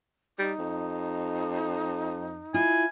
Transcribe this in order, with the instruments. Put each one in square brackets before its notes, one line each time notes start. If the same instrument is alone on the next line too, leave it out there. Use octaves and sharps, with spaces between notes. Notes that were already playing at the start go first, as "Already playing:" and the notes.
[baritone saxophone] G3 [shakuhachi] D#4
[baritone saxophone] F2
[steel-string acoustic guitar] E4 F4 [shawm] G#5